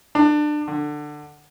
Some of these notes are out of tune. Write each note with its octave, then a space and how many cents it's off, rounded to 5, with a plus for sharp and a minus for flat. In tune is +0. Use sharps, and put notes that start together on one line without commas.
D4 +25
D3 +15